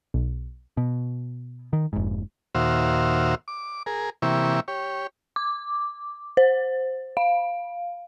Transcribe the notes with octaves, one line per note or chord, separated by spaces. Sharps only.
B1
B2
D#3
F1 G#2
D#2 A#2 F#4 C5 E5 F5
D6
G#4 A#4
C3 E3 A#3 E4 G4 C#6
G4 C#5
D6
C5
F5